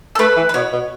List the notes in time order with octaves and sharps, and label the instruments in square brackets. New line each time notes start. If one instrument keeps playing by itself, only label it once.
[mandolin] A4
[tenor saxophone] A3 [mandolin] B4
[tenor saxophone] E3
[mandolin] B4
[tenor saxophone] B2 [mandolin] C#5
[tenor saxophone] B2